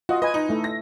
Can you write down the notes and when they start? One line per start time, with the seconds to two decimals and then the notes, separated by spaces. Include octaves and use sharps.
0.09 F4 F#4 D#5
0.22 B4 D#5 G#5
0.34 D#4
0.49 A3 E4
0.64 A#6